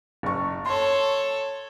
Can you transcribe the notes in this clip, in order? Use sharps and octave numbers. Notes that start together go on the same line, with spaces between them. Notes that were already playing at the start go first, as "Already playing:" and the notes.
F#1 C#6
A4 C#5 C6